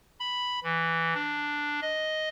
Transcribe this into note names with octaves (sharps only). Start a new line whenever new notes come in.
B5
E3
D4
D#5